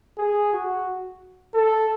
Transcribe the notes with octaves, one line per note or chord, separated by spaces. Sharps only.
G#4
F#4
A4